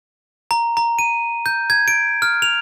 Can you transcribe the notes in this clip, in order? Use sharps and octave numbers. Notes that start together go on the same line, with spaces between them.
A#5
A#5
D#7
G6
G#6
D7
F6
F7